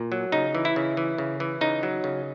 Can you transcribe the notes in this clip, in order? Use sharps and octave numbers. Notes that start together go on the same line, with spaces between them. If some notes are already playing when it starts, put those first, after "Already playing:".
Already playing: A#2
F#3
C#3 D#4
E3
E4
C#3
E3
C#3
E3
C#3 D#4
F#3
C#3